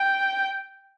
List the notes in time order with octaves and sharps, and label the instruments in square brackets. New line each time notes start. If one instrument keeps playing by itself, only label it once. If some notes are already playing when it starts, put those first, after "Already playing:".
Already playing: [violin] G5